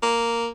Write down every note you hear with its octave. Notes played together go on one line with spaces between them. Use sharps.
A#3